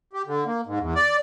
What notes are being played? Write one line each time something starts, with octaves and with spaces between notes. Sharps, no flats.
G4
D3
A#3
G#2
E2
D5